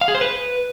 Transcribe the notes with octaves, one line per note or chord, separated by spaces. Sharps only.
F5
G#4
C5
B4